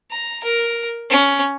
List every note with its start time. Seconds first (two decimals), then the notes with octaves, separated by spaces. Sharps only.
0.11 A#5
0.44 A#4
1.10 C#4